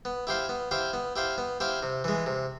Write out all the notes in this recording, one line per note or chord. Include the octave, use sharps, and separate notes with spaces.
B3
E4 G4 C5 F5
B3
E4 G4 C5 F5
B3
E4 G4 C5 F5
B3
E4 G4 C5 F5
C3
E3 G#3
C3